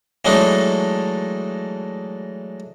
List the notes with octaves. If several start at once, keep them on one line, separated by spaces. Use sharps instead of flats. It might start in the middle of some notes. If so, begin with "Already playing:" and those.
E3 F#3 G#3 A3 D4 D#4